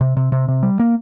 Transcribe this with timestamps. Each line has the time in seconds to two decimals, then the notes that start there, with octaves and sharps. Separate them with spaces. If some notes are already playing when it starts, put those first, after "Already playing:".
0.01 C3
0.17 C3
0.32 C3
0.48 C3
0.63 G3
0.79 A#3